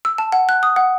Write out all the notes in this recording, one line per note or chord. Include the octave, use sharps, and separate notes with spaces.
E6
A5
F#5
F#6
D#6
F#5